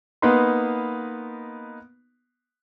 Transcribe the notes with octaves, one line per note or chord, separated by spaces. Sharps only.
A#3 B3 D#4 B4 B5 C6